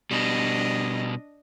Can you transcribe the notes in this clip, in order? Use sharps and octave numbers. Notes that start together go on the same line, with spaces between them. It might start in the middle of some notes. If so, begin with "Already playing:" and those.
B2 G3 D4 D#5